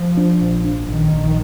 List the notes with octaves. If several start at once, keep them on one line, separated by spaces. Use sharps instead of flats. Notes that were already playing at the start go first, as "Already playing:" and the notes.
Already playing: F3
D4
A#1
D4
A#1 D#3
A#1